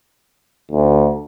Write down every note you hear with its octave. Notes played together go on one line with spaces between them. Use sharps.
D2